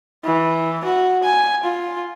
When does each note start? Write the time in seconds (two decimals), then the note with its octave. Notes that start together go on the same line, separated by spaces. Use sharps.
0.25 E3
0.85 F#4
1.24 G#5
1.64 F4